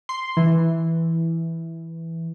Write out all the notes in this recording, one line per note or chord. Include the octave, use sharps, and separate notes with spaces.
C6
E3